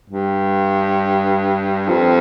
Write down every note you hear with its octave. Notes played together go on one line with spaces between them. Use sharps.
G2
F2